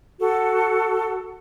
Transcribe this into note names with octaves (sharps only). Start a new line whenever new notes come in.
F#4 A4